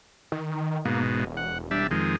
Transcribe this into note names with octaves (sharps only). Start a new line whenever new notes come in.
D#3
G#2 B2 A#3
E1
F#5
G3 D4 E5
F2 D#3 G#3